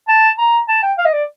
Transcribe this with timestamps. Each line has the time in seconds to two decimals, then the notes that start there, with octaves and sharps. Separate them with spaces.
0.08 A5
0.38 A#5
0.68 A5
0.83 G5
0.98 F5
1.05 D#5
1.13 D5